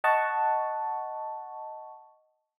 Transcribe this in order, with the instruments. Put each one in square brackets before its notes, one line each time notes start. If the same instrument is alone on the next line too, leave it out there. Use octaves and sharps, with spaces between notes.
[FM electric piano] D#5 F#5 A5 C#6